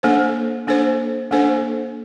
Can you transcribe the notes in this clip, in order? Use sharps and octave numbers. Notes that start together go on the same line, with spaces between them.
A#3 D4 A4 C5
A#3 D4 A4 C5
A#3 D4 A4 C5